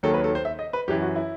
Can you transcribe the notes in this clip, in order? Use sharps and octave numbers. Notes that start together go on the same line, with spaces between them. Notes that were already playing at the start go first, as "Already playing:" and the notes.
D#2 D#3 F#3 A4
B4
A4
C5
E5
D#5
B4
F#2 E3 G4
F#4
E4